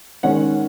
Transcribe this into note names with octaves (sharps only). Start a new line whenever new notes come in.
D#3 G#3 C#4 F#5